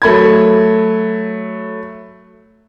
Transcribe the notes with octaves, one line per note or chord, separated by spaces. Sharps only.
F#3 A3 B5 G#6